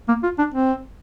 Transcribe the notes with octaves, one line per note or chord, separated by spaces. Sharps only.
A#3
F4
D4
C4